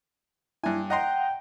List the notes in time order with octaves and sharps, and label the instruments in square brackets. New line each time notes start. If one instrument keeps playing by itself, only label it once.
[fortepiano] G2 G#5 [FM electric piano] E4
[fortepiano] D#5 A#5 C6 [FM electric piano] F#5 [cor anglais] G5